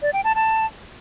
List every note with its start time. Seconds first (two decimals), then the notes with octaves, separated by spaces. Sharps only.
0.02 D5
0.13 G5
0.24 A5
0.35 A5